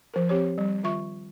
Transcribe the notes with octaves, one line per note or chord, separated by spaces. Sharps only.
F3 A#4
C4 G4 C#5
G3
D#3 F4 E5 C#6